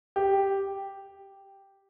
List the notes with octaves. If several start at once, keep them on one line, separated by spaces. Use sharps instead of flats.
G4